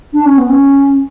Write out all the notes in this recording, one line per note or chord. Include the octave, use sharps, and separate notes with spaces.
D4
C#4
B3
C#4